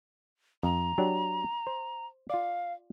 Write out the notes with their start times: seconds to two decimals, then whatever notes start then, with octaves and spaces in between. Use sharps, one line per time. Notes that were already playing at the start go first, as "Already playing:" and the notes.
0.63 F2 A#5
0.98 F#3 D4 G4
1.67 C5
2.30 F4 D5 F5